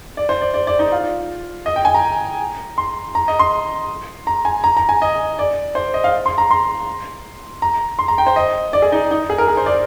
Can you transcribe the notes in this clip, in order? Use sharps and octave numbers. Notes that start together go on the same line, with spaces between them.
D5
C5
D5
D5
D5
D#4
F4
D#5
G5
G#5
A#5
C6
A#5
D#5
C6
A#5
G#5
A#5
A#5
G#5
D#5
D5
C5
D#5
F5
C6
A#5
C6
A#5
C6
A#5
G5
C5
D#5
D5
G#4
D#4
D#4
G#4
A#4
G#4
C5
D5